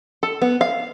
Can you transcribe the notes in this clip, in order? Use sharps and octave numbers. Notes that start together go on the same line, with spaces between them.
A4
B3
F5